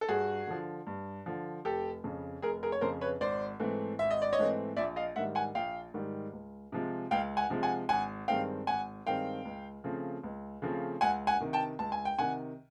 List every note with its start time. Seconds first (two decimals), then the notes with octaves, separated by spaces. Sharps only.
0.01 A4
0.08 G2 F#4 G#4
0.47 D3 F3
0.87 G2
1.26 D3 F3
1.65 F1 G4 A4
2.04 F2 C#3
2.42 F1 G#4 A#4
2.63 G#4 A#4
2.72 C#5
2.81 F2 C#3 A#4 C5
3.01 B4 C#5
3.21 G#1 C5 D5
3.60 G#2 E3 A3 C4
3.99 G#1 E5
4.11 D#5
4.22 D5
4.33 C#5 D#5
4.39 G#2 E3 A3 C4
4.77 A#1 D5 E5
4.96 D#5 F5
5.16 G#2 D#3 G3 E5 F#5
5.35 F#5 G#5
5.55 A#1 F5 G5
5.94 G#2 D#3 G3
6.33 C#2
6.72 C3 F3 G#3
7.11 C#2 F5 G5
7.37 F#5 G#5
7.50 C3 F3 G#3
7.63 F#5 G#5
7.89 G#1 F#5 G#5
8.28 G2 D#3 G#3 C4 F5 G5
8.67 G#1 F#5 G#5
9.06 G2 D#3 G#3 C4 F5 G5
9.45 C#2
9.84 C#3 F3 A3 C4
10.24 C#2
10.62 C#3 F3 A3 C4
11.01 C#2 F#5 G#5
11.27 F#5 G#5
11.40 C3 D#3
11.53 G5 A5
11.79 C#2 A5
11.92 G#5
12.05 G5
12.18 C3 D#3 F#5 G#5